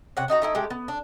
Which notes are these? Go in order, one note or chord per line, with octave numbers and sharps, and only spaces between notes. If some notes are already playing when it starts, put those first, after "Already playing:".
C3 C#5 F#5
D4 D#4 F#4 A#5
A3 D#4 E4
G#3 A3 G4
B3
D4